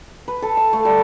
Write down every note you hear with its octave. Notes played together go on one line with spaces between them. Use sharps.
B4
A4
F5
A3
G3